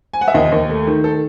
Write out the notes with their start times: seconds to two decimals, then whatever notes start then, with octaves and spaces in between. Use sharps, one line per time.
0.13 G#5
0.21 F#5
0.28 E5
0.34 D#2 D#5
0.52 D#2
0.70 A3
0.87 D#3
1.04 A4